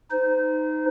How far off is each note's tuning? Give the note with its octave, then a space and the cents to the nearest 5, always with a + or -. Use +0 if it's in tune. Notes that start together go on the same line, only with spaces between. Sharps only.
D#4 +0 C5 -35